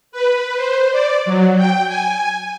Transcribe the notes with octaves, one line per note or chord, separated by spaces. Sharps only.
B4
C5
D5
F#3
G5
G#5